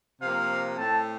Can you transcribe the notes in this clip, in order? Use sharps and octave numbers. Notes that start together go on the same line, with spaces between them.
C3 F3 A#3 F5
A2 A3 C4 A5